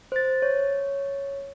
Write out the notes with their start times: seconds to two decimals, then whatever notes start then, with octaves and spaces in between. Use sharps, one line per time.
0.12 C5 A6
0.42 C#5